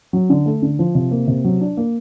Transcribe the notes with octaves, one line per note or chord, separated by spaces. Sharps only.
F#3
D3
A3
D3
F3
C3
A#3
C3
F#3
D4
A#3